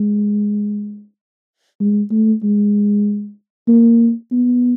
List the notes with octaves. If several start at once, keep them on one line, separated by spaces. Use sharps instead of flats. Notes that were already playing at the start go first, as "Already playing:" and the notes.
Already playing: G#3
G#3
A3
G#3
A#3
B3